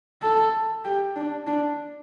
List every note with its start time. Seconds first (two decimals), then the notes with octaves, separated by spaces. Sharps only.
0.22 A4
0.84 G4
1.16 D4
1.47 D4